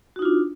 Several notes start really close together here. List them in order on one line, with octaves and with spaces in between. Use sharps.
F#4 D#4 F4 D4